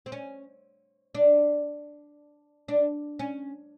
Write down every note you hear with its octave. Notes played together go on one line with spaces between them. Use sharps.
C4
C#4
D4
D4
C#4